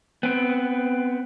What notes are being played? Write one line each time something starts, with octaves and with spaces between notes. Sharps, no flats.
B3 C4